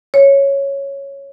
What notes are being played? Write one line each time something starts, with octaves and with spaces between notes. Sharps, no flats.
C#5